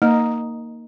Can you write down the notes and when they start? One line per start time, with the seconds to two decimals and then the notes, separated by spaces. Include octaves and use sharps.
0.02 A#3 D#4